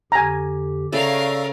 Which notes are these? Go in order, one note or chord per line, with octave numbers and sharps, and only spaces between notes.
F2 D3 G4 G#5 A#5
C#3 A3 A#4 D5 F5 E6